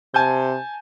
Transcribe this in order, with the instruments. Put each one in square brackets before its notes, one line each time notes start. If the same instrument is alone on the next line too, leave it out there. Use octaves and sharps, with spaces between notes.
[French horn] C3 [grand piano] G#5 A5 G6